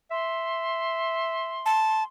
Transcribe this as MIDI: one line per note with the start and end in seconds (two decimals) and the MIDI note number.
0.11 1.74 76
0.11 2.06 84
1.66 2.03 81